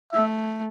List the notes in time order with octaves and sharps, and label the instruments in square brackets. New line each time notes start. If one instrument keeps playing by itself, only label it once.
[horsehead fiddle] A3 [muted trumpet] E5